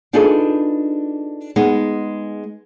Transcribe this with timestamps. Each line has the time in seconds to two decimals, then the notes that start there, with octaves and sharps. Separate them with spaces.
0.13 D4 D#4 F4 G#4 A4 B4
1.56 G#3 B3 D#4